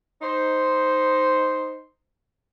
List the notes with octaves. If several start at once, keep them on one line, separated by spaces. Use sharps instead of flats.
D#4 C5